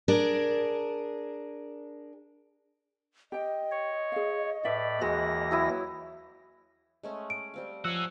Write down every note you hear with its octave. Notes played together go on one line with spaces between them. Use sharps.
D4 G#4 A#4
G4 D#5 G5
C#5
G#4 F5
A2 B4 D5 E5 B5
D#2 E3 G#3 F#4 A#6
F#3 E4 D#6
G#3 A3 C#4
D7
G3 C4 F5
F3 C#4 F#4 E6 F#6